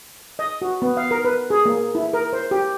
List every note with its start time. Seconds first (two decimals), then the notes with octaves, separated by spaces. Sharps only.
0.39 D#5
0.62 F#4
0.82 B3
0.97 F5
1.11 A#4
1.25 B4
1.50 G#4
1.65 A#3
1.95 E4
2.13 A#4
2.33 C5
2.51 G4